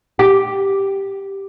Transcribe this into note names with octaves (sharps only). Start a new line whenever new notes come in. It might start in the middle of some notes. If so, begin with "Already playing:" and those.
G4